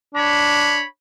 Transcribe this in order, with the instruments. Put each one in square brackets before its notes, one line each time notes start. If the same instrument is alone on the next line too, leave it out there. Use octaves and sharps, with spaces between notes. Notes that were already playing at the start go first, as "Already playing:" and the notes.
[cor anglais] D4 [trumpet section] C#5 B5